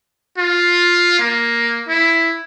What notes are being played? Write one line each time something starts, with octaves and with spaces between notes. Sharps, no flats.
F4
A#3
E4